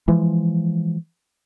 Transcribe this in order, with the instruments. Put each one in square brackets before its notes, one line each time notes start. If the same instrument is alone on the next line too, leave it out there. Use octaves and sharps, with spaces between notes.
[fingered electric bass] E3 F3 G#3